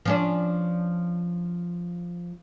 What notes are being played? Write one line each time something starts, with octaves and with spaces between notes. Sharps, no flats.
F3 C#4 D4